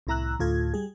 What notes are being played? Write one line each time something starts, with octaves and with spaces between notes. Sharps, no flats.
C2 A2 E4 A#5 E6 F#6
D2 A2 F4 A4 G#6
G3 G#4